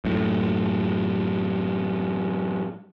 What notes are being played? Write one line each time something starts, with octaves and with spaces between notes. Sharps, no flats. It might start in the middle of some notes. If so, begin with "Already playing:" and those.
F#2 A2